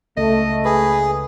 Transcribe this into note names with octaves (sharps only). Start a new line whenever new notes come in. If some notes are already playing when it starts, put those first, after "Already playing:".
C#2 A3 D#5
G#4 B4